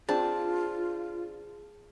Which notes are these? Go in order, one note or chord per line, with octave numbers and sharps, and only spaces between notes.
C4 D4 F4 G#4 A5